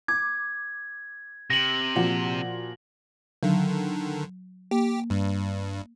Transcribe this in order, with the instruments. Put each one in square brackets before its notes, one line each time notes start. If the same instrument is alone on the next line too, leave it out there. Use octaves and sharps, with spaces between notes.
[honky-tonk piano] D6 [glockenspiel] G#6
[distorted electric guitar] C3 [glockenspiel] A#6 F#7
[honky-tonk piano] A#2 F3 F#4
[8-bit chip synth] D3 D#3 [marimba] F#3
[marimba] A#3 [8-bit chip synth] G4
[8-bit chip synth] G2